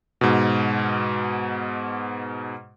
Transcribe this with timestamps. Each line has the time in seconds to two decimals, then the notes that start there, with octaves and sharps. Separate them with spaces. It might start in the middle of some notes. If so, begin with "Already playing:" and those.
0.21 G#2 B2